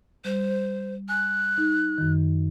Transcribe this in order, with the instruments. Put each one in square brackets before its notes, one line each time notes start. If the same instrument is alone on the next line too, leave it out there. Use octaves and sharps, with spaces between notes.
[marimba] G3 [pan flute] C5
[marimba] G#5 [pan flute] F#6
[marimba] D#4
F#2 D#3